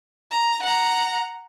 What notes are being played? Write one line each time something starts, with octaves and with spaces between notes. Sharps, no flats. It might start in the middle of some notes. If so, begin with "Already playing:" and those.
A#5
F#5 A#5